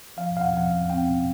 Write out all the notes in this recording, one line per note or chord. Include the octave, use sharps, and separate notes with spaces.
F3 F5
E2 F5
F#5
F3 F#5
F5
E2
C4 G5
C4